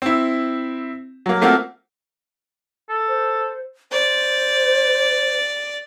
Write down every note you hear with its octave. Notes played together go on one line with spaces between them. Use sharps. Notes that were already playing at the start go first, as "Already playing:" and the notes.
C4 E4
F#3 A#3
A3 A#3 C4 F4 F#4
A4
C5
C5 D5